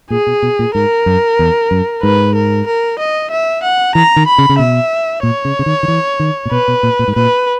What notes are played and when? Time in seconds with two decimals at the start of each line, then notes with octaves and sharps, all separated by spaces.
0.10 A#2 G#4
0.27 B2
0.42 B2
0.59 A#2
0.75 G#2 A#4
1.06 F#2
1.39 E2
1.71 F#2
2.03 G#2 B4
2.35 A#4
2.67 A#4
2.99 D#5
3.31 E5
3.63 F#5
3.95 E3 A#5
4.16 D#3
4.27 B5
4.38 C#3
4.49 C#3
4.59 B2 E5
5.23 A#2 C#5
5.45 C#3
5.59 C#3
5.66 D#3
5.83 D#3
5.88 E3
6.20 D#3
6.45 A#2
6.51 B2 B4
6.68 B2
6.83 A#2
6.99 A#2
7.08 G#2
7.16 A#2 B4